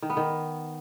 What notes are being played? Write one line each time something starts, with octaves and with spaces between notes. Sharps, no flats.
D#3
B3
D#3